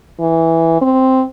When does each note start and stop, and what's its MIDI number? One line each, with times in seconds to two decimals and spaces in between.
0.20 0.81 52
0.82 1.24 60